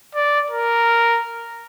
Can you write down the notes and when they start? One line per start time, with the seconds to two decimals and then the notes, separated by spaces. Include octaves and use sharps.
0.15 D5
0.50 A#4